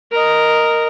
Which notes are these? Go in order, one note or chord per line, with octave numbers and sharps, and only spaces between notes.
A#4 D#5